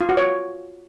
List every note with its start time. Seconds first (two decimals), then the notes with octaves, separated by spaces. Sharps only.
0.01 F4
0.09 F#4
0.17 C#5